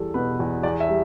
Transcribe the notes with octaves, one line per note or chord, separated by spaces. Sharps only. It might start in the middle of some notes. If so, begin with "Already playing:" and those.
Already playing: E2 G3 A4
B2 B4
E2
E2 D5
E5
G3